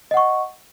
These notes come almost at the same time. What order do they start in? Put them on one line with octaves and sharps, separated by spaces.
D#5 F#5 C#6